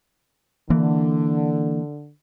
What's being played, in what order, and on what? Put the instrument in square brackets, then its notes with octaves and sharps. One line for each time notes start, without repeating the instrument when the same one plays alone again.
[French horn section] D3 [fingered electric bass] E3 A#3